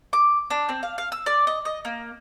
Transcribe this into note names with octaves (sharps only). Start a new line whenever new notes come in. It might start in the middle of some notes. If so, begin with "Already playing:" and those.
D6
D4
C4
F5
F5
E6
D5
D#5
D#5
A#3